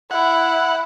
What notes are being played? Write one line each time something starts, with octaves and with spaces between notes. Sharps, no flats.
E4 F#5